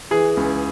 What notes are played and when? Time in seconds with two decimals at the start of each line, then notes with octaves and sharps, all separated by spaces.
0.11 E3 G#4
0.37 C#2